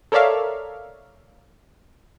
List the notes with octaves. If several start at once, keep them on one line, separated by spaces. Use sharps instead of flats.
A4 A#4 C#5 D5 E5 F5